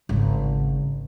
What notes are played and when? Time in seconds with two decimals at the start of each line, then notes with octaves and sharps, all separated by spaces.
0.09 G#1 C#3